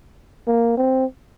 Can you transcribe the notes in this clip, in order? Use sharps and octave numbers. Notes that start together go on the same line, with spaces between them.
A#3
C4